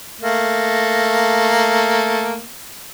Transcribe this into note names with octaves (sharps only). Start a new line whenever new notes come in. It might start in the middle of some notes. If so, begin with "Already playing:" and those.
A3 A#3